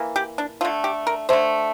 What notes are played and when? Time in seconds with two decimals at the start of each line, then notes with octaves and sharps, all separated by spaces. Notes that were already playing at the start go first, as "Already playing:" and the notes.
Already playing: E3 A#3
0.16 G4
0.38 D4
0.61 D3 A3 F4
0.84 G4
1.07 A#4
1.29 D3 A3 C5